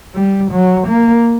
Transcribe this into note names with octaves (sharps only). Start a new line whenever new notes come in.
G3
F#3
A#3